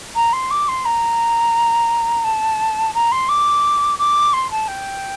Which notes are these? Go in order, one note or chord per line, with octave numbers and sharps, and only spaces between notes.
A#5
C6
D6
C6
A#5
A5
A#5
C6
D6
D6
C6
A5
G5